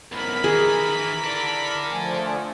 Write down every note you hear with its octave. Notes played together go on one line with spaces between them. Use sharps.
B1 G#2 E4 A#4 B5
D#3 E3 G#4
A4 D5
D3 F3 A3 G#5